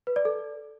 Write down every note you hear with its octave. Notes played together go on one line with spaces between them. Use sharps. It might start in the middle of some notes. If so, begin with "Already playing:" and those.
B4
D5
A4